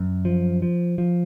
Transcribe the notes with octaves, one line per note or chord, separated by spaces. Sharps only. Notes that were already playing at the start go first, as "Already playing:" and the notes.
Already playing: F#2
F3
F3
F3